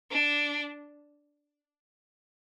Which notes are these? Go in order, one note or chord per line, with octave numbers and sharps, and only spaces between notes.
D4